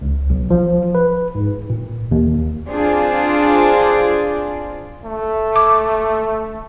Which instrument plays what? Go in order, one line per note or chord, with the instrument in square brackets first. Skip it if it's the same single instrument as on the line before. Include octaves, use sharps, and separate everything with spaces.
[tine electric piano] C#2
B1
F3
B4
G#2
A#2
D#2
[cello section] C4 D4 F4 G#4 C5 D5
[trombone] A3
[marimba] D6